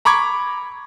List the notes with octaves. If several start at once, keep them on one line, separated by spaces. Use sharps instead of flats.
A#5 B5 C#6 D6 G#6